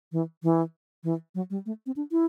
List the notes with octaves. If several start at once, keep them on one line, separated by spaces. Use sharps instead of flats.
E3
E3
E3
F#3
G3
A3
C4
D4
E4